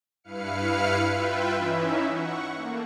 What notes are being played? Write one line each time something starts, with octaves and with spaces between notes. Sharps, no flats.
G2 E4 B4 F5 F6 C#7
F4 B4 E5 G5
E3 C#4 D#4 E4 E5
F#5 C#6
A3 A#3